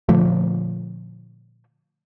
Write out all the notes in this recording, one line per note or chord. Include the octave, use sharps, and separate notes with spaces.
A#2 D3 F3 A3